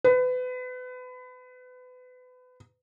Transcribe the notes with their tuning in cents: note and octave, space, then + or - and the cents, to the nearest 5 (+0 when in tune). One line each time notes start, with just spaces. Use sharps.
B4 +30